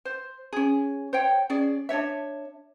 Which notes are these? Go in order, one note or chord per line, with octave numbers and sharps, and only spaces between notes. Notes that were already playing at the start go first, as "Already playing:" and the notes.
C5
C#4 G#4
C5 C#5 G5
C#4 G#4 D5
D4 F4 C#5 E5